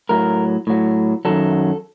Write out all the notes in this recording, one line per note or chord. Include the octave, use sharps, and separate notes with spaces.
A2 F#3 A#4
A2 F#3
F#2 D#3 F#3 A4